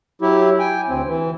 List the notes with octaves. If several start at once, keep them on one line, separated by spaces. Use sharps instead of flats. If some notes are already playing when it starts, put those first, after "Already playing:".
F#3 E4 G4
G5 G#5
D2 C4
E3